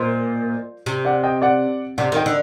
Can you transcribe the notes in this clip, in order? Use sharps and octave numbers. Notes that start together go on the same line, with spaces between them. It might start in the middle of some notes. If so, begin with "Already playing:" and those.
Already playing: A#2 C5 D#5
C3
D5 F#5
D#5 G5
D5 F#5
C3 D5 F#5
D#3 D#5 G5
D3